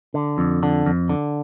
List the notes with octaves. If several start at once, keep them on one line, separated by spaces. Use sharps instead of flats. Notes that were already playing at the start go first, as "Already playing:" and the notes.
D3
F2
D3
F2
D3